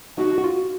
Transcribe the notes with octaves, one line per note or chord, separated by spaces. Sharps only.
D#4 F#4
F#4
F4